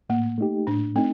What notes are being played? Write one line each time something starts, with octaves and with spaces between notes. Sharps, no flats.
A2 A#3
A3 D#4 G4
A2 D4
A3 C4 D#4